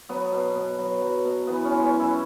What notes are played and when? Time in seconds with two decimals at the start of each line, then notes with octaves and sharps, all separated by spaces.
0.09 F#3 B3
0.32 B2
0.55 B2
0.78 F#3
1.01 F#3
1.25 B2
1.47 E3 B3
1.65 C#4
1.71 G#3
1.82 C#4
1.94 F#2
2.00 E4